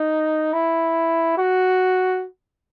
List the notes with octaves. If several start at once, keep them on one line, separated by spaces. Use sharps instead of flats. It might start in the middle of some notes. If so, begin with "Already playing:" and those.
Already playing: D#4
E4
F#4